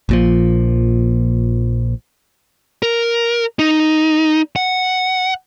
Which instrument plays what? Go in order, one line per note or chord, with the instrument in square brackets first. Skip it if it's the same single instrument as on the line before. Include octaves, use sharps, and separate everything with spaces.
[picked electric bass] A#1 A#2 F3
[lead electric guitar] A#4
D#4
F#5